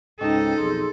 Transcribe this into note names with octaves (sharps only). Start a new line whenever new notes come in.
C#2 G#2 C#4 D#4 A4 D#5 G5
B1 F2 G#4 C6 E6